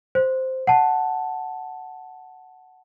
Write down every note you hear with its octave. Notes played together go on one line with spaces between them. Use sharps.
C5
F#5 A5